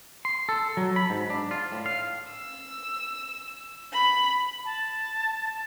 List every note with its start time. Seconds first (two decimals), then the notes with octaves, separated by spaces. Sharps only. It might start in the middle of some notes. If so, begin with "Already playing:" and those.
0.25 C6
0.49 A4
0.77 F#3
0.96 B5
1.10 G#2
1.30 D4
1.51 F4
1.72 A2
1.86 F5
2.30 E6
3.92 B5
4.65 A5